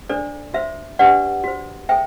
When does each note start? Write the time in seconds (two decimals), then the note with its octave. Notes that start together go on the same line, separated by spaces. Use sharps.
0.09 D4 A4 C5 D5
0.54 F#4 C5 E5
0.99 D4 G4 B4 D5 F#5
1.44 F#4 C5
1.89 A4 C5 E5 G5